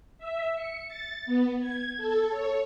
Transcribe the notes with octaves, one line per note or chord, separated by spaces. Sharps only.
E5
C#7
A6
B3
G#6
A4
C#5